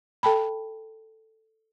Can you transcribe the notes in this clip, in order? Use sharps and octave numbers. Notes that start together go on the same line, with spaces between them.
A4 G5 A5 B5